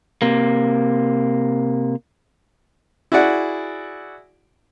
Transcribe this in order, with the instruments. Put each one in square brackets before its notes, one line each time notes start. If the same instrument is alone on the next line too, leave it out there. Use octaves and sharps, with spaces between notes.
[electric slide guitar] C3 A#3
[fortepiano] E4 F#4 G#4 D5 F#5